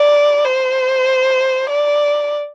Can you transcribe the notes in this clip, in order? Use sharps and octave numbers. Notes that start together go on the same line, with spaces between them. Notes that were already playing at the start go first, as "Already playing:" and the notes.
Already playing: D5
C5
D5